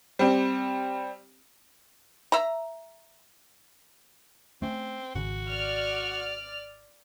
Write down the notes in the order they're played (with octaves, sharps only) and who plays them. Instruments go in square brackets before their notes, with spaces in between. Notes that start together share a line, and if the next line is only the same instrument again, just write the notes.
[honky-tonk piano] G3 C4
[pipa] E5 A#5
[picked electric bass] A3 C#4 [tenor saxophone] C4
[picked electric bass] G#1 C#3 [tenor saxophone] F#4
[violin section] D5 F6